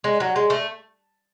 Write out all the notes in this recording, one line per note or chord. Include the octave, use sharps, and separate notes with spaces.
G#3
F#3
G#3
A3